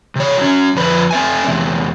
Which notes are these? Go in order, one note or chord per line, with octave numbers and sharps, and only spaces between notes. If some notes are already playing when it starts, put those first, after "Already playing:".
C3 C#5
F#3 C#4
F2 F3 B4
C4 E5 G#5
E2 C3